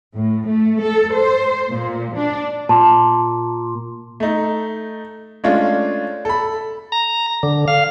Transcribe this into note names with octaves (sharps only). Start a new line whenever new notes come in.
A2
A3
A4
C5
A#2
D4
A#2 A5
A3 D#4
G#3 A3 C#4 D4 F4
A4 B5
A#5
D3
F5